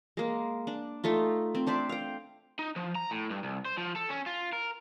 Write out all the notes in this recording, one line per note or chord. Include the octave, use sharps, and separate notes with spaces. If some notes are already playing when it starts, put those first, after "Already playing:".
G#3 A#3
D4
A3 D#4 F4
C4
D4 C5 D5 E5
F5 G5
D#4
F3
A#5
A2
G2
C2
C5
F3
A4
C#4
F4
A#4